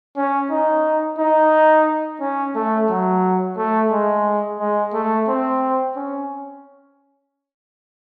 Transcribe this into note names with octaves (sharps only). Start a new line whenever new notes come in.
C#4
D#4
D#4
C#4
A3
F#3
A3
G#3
G#3
A3
C4
C#4